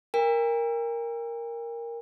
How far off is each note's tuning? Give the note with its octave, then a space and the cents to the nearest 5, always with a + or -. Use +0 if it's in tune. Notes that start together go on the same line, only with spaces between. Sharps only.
A#4 +0 G5 +45